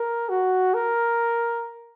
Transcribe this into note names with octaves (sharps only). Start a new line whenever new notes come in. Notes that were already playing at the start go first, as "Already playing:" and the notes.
Already playing: A#4
F#4
A#4